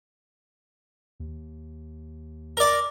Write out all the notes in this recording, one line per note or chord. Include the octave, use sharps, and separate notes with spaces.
D#2
A#4 D5